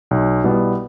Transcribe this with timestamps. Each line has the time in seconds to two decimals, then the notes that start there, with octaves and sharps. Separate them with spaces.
0.11 B1
0.44 B2 G3 B3 E4